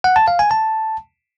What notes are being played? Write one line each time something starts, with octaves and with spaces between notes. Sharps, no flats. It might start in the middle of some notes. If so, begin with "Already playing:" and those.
F#5
A5
F5
G#5
A5